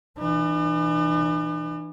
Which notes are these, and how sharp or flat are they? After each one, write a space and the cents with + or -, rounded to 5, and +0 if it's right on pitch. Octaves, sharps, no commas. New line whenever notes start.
E3 +0 D4 +45